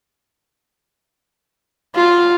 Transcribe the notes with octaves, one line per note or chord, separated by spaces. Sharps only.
F4